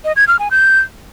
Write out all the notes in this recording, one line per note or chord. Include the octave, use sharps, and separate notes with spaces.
D#5
G#6
F6
G#5
G6